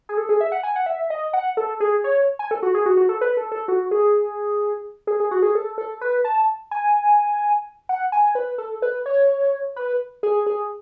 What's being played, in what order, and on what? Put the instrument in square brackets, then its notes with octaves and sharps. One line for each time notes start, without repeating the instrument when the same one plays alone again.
[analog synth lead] G#4
A4
G#4
E5
F#5
G#5
F#5
E5
D#5
F#5
A4
G#4
C#5
G#5
A4
F#4
G#4
F#4
F#4
A4
B4
A4
A4
F#4
G#4
G#4
G#4
F#4
G#4
A4
A4
B4
A5
G#5
F#5
G#5
B4
A4
B4
C#5
B4
G#4
G#4